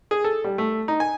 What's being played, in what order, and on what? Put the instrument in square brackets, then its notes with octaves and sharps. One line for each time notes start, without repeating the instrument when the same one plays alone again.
[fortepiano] G#4
A4
G3
A3
D#4
G#5